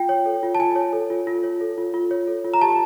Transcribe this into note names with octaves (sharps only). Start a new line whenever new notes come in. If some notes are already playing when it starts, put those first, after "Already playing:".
Already playing: F4 G5
C#5
A4
F4
A5
F4 G#5
C#5
A4
F4
F4
C#5
A4
F4
F4
C#5
A4
F4
A#5
G4 A5